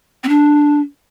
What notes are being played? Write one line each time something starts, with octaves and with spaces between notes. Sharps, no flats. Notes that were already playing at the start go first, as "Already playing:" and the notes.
C4
D4